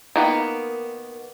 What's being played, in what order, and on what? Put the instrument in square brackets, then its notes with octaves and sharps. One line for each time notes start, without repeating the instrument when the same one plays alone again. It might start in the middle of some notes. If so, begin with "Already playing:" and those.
[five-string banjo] D#3 A#3 B3